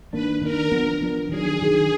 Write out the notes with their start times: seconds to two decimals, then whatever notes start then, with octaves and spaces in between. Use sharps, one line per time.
0.13 D#3 A#3 D4 B4
0.41 D#3 A#3 D4 A#4
0.72 F3 B3 D4
1.01 F3 B3 D4
1.29 D#3 F#3 D4 G#4
1.59 D#3 F#3 D4